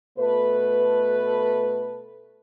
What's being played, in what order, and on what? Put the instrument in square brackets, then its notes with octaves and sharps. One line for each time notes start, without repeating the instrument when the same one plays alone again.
[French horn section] B2 A3 A4 B4